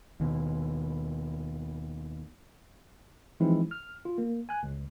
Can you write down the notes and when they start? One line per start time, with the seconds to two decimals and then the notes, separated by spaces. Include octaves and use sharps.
0.20 D#2 B2
3.40 E3 F3 G#3 C4 D#4 E4
3.71 F6
4.05 F4
4.18 A#3
4.49 G#5 F#6
4.63 C#2